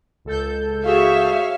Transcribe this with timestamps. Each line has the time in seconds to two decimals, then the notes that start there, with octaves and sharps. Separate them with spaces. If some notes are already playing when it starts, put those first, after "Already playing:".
0.25 C#2 A4 G6
0.86 F#4 G#4 C#5 E5 F5